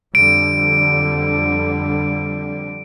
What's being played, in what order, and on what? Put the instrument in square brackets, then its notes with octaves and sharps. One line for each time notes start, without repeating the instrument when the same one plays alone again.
[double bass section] F2 D3 G3 [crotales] D7